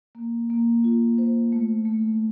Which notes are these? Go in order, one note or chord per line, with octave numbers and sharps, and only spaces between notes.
A#3
A#3
F4
C5
A3
A3